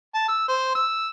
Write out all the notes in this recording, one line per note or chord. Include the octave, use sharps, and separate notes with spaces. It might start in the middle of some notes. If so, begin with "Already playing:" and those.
A5
E6
C5
E6